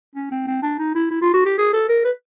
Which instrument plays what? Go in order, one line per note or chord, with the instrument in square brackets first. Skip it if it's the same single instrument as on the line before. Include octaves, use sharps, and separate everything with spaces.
[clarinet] C#4
C4
C4
D4
D#4
E4
E4
F4
F#4
G4
G#4
A4
A#4
B4